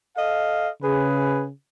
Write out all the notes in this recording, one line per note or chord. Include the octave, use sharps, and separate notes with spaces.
A4 D#5 F5
C#3 G#4 B4